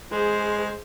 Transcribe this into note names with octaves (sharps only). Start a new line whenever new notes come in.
G#3 G#4 C5